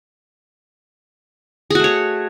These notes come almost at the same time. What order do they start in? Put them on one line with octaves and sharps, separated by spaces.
G#4 F#4 A3 C#5